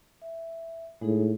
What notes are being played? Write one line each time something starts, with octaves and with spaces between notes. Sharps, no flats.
E5
A2 G#3 D#4 G#4